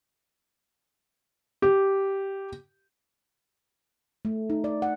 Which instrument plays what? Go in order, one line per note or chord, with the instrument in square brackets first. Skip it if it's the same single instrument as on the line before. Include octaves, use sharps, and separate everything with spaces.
[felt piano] G4
[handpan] A3
D#4
D5
F#5